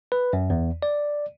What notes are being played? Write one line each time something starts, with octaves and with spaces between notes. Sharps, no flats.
B4
F#2
E2
D5